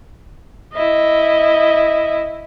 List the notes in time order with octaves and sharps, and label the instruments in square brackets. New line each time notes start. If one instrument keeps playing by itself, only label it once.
[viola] E4 D#5